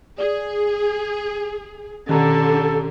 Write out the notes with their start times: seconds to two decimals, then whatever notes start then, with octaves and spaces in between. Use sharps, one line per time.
0.18 G#4 D5
2.09 B2 D3 D#3 C#4 G4 A4 A#5